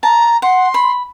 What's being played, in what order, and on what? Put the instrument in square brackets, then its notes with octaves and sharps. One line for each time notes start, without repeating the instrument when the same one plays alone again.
[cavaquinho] A5 [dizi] A#5
[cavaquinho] F#5 [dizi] C6
[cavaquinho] B5